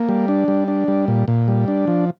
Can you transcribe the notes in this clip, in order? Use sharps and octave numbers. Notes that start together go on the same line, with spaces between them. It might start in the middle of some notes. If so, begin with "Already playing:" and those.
Already playing: A#3
G3
D4
G3
D4
G3
A#2
A#2
G3
D4
F3